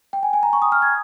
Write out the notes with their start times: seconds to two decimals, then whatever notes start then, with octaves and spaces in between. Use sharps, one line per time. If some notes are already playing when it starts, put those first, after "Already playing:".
0.13 G5
0.23 G#5
0.33 G#5
0.43 A#5
0.53 C#6
0.62 D#6
0.72 F6
0.82 G#6